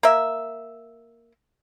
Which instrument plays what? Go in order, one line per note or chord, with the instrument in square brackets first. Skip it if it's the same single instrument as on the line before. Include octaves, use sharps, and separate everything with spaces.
[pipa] A#3 E5